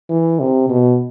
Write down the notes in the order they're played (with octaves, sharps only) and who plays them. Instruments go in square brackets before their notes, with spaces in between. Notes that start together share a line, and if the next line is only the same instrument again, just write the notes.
[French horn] E3
C3
B2